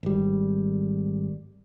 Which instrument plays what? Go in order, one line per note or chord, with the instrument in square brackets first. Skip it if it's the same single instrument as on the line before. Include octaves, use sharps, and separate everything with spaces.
[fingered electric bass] G#1 G3